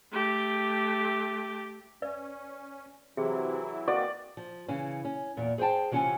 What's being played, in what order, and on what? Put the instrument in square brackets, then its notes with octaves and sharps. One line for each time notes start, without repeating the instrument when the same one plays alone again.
[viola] A3 G4
[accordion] C#4 [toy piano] B4 D5
[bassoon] C3 [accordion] E3 F#3 E4 [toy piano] G#4
[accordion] A#3 C4 D#5 [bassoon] F#4 [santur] D5
[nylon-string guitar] F3
C#3 E3 C#4
C#4
E2 A#2
G#4 C5 C#5 G5 A5
C3 E3 C#4 F4 F#5 G#5